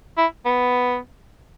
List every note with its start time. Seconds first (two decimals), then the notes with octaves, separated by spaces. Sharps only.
0.17 E4
0.45 B3